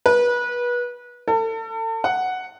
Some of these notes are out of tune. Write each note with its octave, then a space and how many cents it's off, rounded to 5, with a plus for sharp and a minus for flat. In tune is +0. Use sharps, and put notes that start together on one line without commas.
B4 -30
A4 +40
F#5 +0